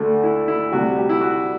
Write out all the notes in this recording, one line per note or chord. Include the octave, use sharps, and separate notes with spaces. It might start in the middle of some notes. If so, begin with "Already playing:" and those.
Already playing: D2 D3 A3
E4
E4
D2 C3 G3 F#4
G4
E4
F#4